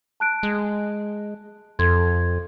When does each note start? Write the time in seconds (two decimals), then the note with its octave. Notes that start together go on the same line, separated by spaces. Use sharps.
0.20 A5 F#6 D7
0.43 G#3
1.79 F2 A4 C6 G#6